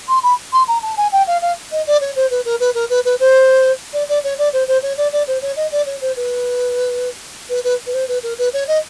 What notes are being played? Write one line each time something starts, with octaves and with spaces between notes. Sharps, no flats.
C6
B5
C6
A#5
A5
G#5
G5
F5
F5
D#5
D5
C#5
C5
B4
A#4
B4
A#4
B4
B4
C5
D5
D5
C#5
D5
C5
C5
C#5
D5
D5
C5
C#5
D#5
D5
C#5
C5
B4
B4
B4
B4
C5
B4
A#4
B4
C#5
D#5